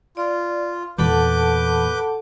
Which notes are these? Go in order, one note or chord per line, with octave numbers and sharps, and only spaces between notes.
F4 D5
E2 A#2 A4 B4 F#5 A5 D6 G6